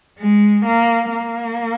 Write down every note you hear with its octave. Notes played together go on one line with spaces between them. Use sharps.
G#3
A#3
A#3